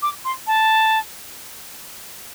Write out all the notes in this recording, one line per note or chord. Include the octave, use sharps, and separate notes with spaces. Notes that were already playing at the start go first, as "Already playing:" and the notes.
D6
C6
A5